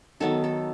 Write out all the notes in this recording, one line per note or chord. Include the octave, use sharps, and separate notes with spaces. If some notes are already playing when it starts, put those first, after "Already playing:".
D#3 F#3 B3 A4
A4